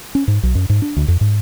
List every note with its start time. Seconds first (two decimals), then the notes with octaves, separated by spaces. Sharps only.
0.15 C#4
0.28 G#2
0.43 B1
0.55 F#2
0.69 G#2
0.82 D4
0.97 D2
1.08 F2
1.21 G#2